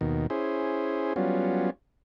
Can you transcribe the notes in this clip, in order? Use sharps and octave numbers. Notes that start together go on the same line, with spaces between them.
D#2 B2 D#3
C#4 E4 G#4 C5
F#3 G3 B3 C#4 F4